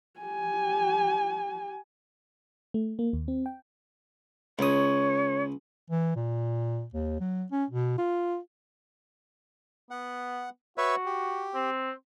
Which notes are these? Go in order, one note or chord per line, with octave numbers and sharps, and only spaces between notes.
G4 G#5
A3
A#3
D#2
C4
G5
C#2 C#5 D#6
E3
A#2
D#2
F#3
C#4
B2
F4
B3 F#5
F#4 B4 C#5 E5
G4
C4